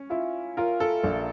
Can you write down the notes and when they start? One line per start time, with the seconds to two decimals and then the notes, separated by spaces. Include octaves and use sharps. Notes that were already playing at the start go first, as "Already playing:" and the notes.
Already playing: C#4
0.10 E4 F4
0.57 F4 A#4
0.80 A4
1.04 A#1